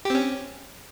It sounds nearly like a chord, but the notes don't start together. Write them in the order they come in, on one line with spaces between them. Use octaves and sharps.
G4 C4 C#4